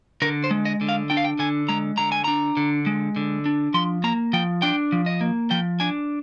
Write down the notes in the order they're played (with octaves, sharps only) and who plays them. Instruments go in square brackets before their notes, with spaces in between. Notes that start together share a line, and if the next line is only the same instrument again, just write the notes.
[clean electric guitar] D3 A#4
C5
G#3
D#5
D3
F5
D4 G5
F5
G5
D3 G#5
G#3 A#5
D3 A#5
G#5
D4 A#5
D3
G#3
D3
D4
F3 C6
A#3 A#5
F3 G5
D4 G5
F3
D#5
A#3
F3 G5
D4 G#5